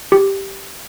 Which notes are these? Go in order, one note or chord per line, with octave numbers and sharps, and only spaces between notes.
G4